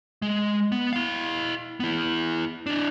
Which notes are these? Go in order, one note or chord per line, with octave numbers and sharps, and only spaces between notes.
G#3
B3
E4 F5
B3 E4
D4 E4